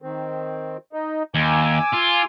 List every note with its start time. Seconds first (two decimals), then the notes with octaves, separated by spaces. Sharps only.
0.02 D#3 C4
0.93 D#4
1.35 D#2 G#5 D6 E6
1.93 F4